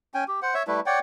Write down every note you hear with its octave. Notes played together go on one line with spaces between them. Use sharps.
C#4 G5 G#5
G4
C5 F#5
C#5 E5
G3 A3 E4 B4
C#5 D5 F#5 G5